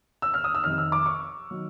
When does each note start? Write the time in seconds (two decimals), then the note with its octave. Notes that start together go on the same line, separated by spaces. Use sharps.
0.22 E6
0.34 F6
0.44 D#6
0.55 E6
0.64 F2 C3 D#3 F6
0.78 E6
0.92 D6
1.06 C#6
1.50 D#3 F#3